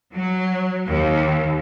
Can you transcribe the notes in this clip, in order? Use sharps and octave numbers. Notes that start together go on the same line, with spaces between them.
F#3
D#2